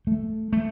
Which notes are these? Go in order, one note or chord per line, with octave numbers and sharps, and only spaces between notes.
A3
A3